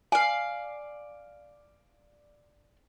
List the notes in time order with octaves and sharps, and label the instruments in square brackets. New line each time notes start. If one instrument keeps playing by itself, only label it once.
[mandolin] D5 F5 [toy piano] G#5